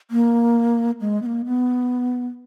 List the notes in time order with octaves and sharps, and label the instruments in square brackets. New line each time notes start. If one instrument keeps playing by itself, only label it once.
[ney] A#3
G#3
B3
A#3
B3